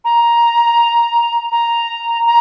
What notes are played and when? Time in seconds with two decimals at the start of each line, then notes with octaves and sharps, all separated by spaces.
0.04 A#5
1.52 A#5
2.26 A#5